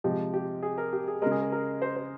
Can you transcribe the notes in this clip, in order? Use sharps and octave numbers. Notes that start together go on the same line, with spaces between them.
C3 F3 G#3 G4
G4
G#4
A#4
G4
G#4
C#3 G#3 A#4
G#4
A#4
A#4
C5
C5